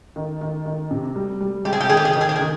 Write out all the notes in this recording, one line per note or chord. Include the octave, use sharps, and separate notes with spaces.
D#3
D#3
D#3
C3
G3
G3
G#3 G4
G#4
G4
D#3 G#4
G4
G#4
D#3 G4
G#4
G4
G#4
D#3